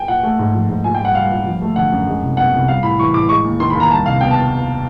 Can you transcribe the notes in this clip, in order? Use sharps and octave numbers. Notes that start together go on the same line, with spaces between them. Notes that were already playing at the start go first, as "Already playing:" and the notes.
Already playing: G5 G#5
A#2 F#5
A3
G#2
F3
G#2
A#2 G#5
G5
G3
F#5
G3 F5
A#2
F3
A3
D3 F#5
F#2
G#3
C2
B2 F#5
C2
G3 F5
A2 B5
E3 C#6
A2 D6
G#3 C#6
D#2
D#3 C6
B5
D#2
A#5
G3 A5
C2 F5
B2 G5
A5